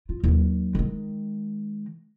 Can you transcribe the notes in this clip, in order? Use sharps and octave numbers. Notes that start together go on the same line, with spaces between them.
F4
D#2 F#3
D#3 G#3